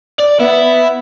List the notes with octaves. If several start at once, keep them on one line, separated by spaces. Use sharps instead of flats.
D5
B3 E4